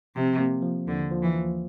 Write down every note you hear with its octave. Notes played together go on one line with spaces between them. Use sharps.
C3 F3
A#3
F3
D#2 D3
F3
E3
F3